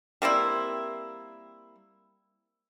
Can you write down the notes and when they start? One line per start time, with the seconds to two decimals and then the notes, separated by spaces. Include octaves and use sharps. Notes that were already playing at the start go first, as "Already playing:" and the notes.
0.22 G3 A#3 C4 E4